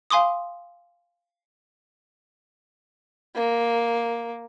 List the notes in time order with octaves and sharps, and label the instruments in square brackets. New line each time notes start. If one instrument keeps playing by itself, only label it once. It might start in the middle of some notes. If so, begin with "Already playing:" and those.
[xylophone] F5 G#5 C6 D6 D#6
[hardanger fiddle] A#3